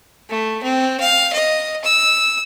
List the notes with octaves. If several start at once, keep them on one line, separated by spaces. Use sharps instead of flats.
A3
C4
F5
D#5
E6